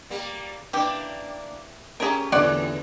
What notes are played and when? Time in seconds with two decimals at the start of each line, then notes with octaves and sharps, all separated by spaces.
0.10 G3 A#3
0.73 E3 A#3 D4 G4
2.00 A3 C#4 G4 G#4 A#4
2.32 E2 A2 D3 E3 C#5 D5 F#5